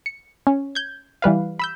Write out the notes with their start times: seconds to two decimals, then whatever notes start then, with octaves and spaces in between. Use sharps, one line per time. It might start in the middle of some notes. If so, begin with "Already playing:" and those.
0.06 C#7
0.47 C#4
0.75 G6 G#6
1.22 E3 G3 B4 F5
1.59 B5 E6 G6